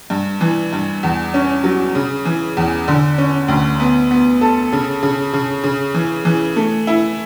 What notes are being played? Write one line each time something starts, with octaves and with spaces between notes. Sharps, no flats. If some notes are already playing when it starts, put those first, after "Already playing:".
G2
E3
G2
E2
C#4
F#3
C#3
E3
E2
D3
C#4
D2
B3
B3
A4
C#3
C#3
C#3
C#3
E3
E3
A3
E4